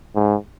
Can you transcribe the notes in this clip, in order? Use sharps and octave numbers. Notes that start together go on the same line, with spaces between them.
G#2